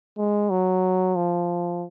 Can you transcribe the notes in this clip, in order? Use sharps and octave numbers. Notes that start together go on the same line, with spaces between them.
G#3
F#3
F3